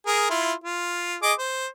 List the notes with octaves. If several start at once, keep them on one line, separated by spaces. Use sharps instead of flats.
G#4 A#4
E4 F4 C6
F4
G#4 D#5 D6
C5